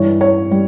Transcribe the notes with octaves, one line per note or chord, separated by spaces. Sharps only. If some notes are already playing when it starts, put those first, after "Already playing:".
Already playing: G2 E3 G3 C#5
C#5
G3